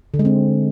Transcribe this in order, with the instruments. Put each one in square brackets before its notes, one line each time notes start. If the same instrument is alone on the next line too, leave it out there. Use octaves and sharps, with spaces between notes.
[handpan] D3
G#3
C4